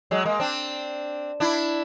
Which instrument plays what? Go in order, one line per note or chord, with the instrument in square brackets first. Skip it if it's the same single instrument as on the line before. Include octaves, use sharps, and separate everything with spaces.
[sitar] F#3 G#3
G#3 A#3
C4 D4
D4 E4